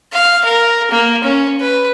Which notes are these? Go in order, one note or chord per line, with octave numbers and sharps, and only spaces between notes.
F5
A#4
A#3
C#4
B4